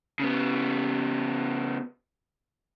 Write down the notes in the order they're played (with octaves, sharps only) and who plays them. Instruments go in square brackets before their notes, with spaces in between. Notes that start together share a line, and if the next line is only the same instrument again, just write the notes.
[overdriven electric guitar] C#3 B3